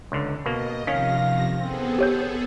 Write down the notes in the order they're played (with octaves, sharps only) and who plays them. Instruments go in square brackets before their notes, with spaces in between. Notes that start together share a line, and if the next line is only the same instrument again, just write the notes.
[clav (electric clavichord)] C#2 D3
[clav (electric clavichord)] B2 A#3 [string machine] D#5
[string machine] C3 F3 A#6 [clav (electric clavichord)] D#3 C#4 [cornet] F5 [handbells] B6
[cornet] F5
[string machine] B3 G#4 A4 [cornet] C4
[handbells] G4 C#5 G6